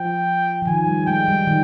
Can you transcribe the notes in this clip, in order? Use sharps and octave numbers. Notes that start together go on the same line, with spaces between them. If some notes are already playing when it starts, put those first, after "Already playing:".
Already playing: F3 G5
F3
D#3 G#5
G3
G#3 G5
G3
D#3